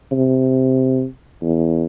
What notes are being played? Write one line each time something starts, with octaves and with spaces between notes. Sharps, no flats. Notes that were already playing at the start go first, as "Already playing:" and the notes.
C3
E2